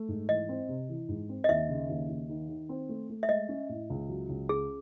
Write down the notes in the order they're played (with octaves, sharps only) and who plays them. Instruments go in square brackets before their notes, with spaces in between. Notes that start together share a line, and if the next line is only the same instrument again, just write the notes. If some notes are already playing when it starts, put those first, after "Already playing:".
Already playing: [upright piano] A3
G#2
[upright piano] E3 [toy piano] D#5
[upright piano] C4
C3
E3
G#2
C4
[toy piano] D#5
[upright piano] D#2 [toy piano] E5
[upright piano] C#3
D#2
D#2
D#3
D#3
C4
A3
A3
[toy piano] E5
[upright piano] G#3 [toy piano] D#5
[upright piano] C#4
A2
C#2
F#3
C#2
[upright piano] C#4 [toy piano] G#4